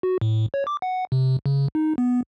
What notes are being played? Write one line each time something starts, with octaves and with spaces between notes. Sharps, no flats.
F#4
A2
C#5
D6
F#5
C3
C#3
D#4
B3